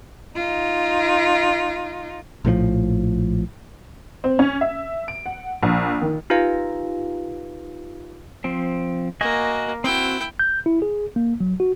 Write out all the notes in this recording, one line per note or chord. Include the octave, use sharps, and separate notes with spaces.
D#4 F4
A#1 A2 D3 F3
C4
C#4
E5
D7
F#5
A#1
D#3
D#4 F4 G4 B4 F5
F3 C4
A#3 F#4 D#5 G#5
C4 E4 F#4 G5
G6
E4
G#4
A#3
F#3
F#4